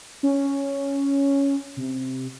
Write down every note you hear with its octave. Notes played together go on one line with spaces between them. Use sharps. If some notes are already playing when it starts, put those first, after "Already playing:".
C#4
C3